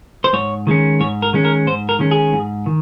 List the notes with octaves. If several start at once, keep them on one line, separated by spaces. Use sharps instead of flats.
C5
G#2 C#5
D#3 G#3 C#4
G#2 C#5
A#4
D#3 G#3 C#4
A#4
G#2 C5
A#4
D#3 G#3 C#4
G#4
G#2
D#3